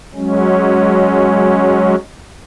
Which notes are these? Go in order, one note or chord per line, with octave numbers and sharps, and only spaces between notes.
F#3 G#3 C#4